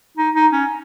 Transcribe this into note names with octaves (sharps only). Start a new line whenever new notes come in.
D#4
D#4
C#4